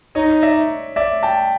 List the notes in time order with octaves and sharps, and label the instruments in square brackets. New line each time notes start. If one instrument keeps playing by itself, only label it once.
[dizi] D#4 [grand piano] C#5 D#5
[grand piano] D5 E5
D5 E5
G5 A5